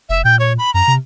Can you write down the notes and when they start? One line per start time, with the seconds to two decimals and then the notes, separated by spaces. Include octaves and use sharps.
0.09 F1 E5
0.25 A#2 G5
0.39 C#5
0.58 B5
0.74 F#2 A#5
0.88 C3